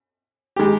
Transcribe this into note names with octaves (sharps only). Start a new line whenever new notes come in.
D#3 G#3 G4